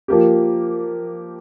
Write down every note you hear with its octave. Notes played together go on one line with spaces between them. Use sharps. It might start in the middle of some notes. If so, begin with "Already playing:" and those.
F3 A#3 G4